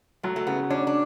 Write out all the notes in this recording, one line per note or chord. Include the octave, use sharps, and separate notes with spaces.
F#3 A3
A3
C#3 B3
C#4 D4
D4